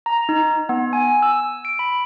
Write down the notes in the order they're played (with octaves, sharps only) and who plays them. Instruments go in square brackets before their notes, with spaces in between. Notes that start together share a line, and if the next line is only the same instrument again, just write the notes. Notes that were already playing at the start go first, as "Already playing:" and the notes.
[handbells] A#5
D#4
B3
G#5
E6
D7
B5